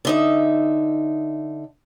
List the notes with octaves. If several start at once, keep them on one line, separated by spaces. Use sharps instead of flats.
D3 D#4 E5